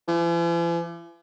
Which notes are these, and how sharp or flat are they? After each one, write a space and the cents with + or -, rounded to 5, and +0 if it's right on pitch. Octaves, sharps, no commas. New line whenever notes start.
E3 +45